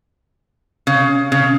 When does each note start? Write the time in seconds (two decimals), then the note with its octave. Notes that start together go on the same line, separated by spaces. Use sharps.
0.87 C#3
1.32 C#3